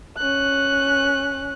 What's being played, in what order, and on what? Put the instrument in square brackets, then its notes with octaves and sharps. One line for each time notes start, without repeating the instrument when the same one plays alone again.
[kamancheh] C#4 F#6